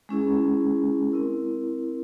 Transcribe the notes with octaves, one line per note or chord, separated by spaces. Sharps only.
G#3 C#4 E4 G#4
C4 E4 A#4